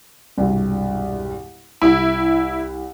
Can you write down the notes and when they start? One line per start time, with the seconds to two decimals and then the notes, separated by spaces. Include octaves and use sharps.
0.37 E1 C2 G2
1.82 C2 E4